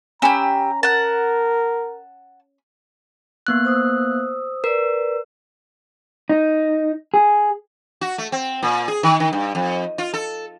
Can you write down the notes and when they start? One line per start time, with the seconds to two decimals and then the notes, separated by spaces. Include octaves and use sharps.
0.22 C#4 G4 G#5 A#5 B5 E6
0.83 A#4 F#5 A5
3.47 A#3 B3 F#6
3.65 C5 D#6 E6
4.64 A#4 B4 D5
6.29 D#4
7.14 G#4
8.01 F#4
8.18 A3
8.32 C4
8.63 A#2
8.88 G#4
9.03 D#3
9.20 D#3
9.33 G2
9.55 F2
9.98 F4
10.14 A4